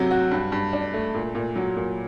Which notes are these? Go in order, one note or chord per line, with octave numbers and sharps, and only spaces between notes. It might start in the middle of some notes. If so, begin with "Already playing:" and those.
Already playing: C3 F#3 C4
F#4
G2
G2
D4
A3
A#2
A#2
F#3
A#2